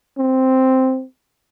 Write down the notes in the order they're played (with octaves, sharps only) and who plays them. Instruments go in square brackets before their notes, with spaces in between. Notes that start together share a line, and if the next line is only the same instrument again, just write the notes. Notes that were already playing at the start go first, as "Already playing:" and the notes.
[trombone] C4